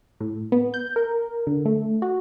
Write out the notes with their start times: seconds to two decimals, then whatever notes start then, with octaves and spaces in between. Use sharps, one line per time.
0.20 A2
0.52 B3
0.74 G6
0.96 A#4
1.47 D3
1.65 A3
2.02 F#4